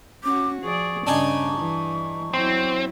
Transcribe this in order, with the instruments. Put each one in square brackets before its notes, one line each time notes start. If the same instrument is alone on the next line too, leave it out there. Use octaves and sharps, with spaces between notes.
[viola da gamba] C#4 F#4 [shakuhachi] D6
[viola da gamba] F3 G#4 D5 [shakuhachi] C#6
[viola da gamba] G2 C#3 [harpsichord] D4 D#4 G#4
[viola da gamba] E3
[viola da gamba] F#3 E4 [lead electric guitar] C4